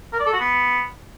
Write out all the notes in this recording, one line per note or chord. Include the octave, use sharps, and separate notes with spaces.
A#4
D5
A4
F#4
B3